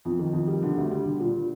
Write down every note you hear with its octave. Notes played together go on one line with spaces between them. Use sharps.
F2
D#3
F2
G3
D3
D2
G3
D3
A#2